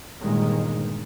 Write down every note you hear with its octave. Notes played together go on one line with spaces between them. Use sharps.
G1 G2 A#2 D#3 G#3